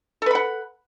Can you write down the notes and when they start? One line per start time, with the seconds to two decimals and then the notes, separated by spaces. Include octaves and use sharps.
0.22 A4
0.26 B4
0.31 B5
0.35 F#5